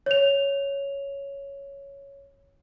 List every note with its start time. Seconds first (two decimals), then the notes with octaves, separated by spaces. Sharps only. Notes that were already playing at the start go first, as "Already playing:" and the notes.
0.06 C#5 F7